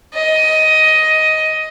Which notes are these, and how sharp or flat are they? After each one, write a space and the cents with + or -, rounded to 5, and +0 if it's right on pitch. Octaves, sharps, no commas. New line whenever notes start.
D#5 +10